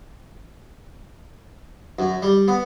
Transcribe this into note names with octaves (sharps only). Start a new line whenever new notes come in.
F#2
G3
B3